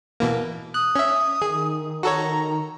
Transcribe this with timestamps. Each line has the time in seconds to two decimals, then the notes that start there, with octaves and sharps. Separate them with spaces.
0.20 B2 E3 A#3
0.74 D#6 F#6
0.96 C#4 E5
1.42 D#3 G#4
2.03 F#4 A4 C#5 A#5